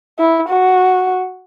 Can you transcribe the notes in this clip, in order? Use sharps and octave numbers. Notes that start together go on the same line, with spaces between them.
E4
F#4